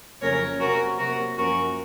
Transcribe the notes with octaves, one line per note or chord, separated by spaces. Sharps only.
F2 C#3 F#3 A#3 C#4 A#4 C#5
C3 F#3 A#3 C#4 F#4 A#4
C3 F#3 A#3 F#4 A#4
F#2 F3 A#3 C#4 F#4 A#4